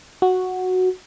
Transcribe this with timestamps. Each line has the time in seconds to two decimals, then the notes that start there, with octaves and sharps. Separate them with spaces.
0.22 F#4